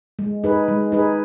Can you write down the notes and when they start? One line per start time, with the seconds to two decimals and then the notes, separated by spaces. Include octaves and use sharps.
0.19 G#3
0.44 D#4 G#4 B4
0.68 G#3
0.92 D#4 G#4 B4